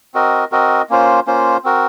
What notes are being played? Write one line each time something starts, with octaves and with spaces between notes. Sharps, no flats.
C4 F#4 A#4 D#5
C4 F#4 A#4 D#5
A#3 C#4 F4 C5
A#3 C#4 F4 C5
C4 F#4 A#4